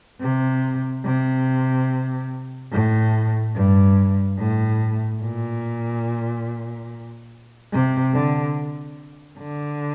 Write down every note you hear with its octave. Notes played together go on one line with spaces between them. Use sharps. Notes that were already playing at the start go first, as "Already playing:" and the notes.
C3
C3
A2
G2
A2
A#2
C3
D3
D3